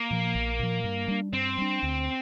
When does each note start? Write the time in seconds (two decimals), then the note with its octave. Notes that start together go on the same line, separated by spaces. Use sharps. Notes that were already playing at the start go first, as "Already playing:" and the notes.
Already playing: A#3
0.11 A#2 F3
0.35 A#1
0.59 A#2 F3
0.84 G2
1.08 G3 D4
1.33 G2 C4
1.58 G3 D4
1.83 D2